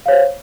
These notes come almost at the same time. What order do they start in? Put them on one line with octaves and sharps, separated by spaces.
F5 C#5 C5